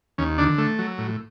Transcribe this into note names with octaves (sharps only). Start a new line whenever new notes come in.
D#2 C#4
D3 D4
A3
F#3
A2